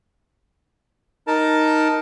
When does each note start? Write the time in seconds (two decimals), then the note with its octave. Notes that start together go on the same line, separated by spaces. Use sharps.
1.27 D#4 A#4 A5